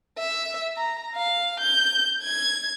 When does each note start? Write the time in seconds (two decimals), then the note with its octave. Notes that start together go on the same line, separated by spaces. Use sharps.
0.18 E5
0.77 A#5
1.16 F5
1.61 G6
2.22 G#6